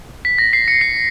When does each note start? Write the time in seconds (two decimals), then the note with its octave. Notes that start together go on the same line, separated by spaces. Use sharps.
0.25 B6
0.38 A#6
0.53 C7
0.68 C#7
0.81 C7